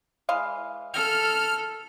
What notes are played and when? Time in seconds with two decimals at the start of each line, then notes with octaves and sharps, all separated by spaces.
0.29 E3 G#3 F5
0.94 A4 F6